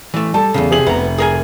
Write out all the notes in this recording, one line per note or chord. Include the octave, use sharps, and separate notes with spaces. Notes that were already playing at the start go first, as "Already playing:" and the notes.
E3 A3
G3 A4 A5
E2 A#2 C#3
C3 G#4 F#7
F1 B3 A#5
G#4 A#4 G#5